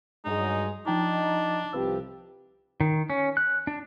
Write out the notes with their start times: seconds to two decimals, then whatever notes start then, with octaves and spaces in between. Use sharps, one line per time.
0.25 G2 F#3 G#3 D#4
0.87 F3 D4 D#4 G5 A#5
1.73 C2 F3 C4 G4 B4 E6
2.81 D#3
3.10 C#4
3.37 F#6
3.67 D4